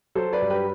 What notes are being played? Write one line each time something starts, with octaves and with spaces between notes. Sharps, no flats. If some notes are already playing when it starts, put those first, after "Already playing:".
F#3 A4 C5
B4 D5
G2
G4 B4